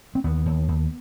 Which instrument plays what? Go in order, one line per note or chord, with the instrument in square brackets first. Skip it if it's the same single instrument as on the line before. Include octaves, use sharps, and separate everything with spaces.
[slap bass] C4
D#2 B3
D#2
D#2